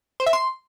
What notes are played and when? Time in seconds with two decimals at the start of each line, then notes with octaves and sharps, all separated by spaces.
0.20 C5
0.26 E5
0.33 C6